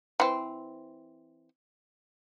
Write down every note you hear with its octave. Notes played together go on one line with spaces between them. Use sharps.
E3 C4